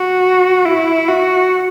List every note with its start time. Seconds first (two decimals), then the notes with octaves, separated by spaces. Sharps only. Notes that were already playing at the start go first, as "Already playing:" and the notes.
Already playing: F#4
0.65 E4
1.08 F#4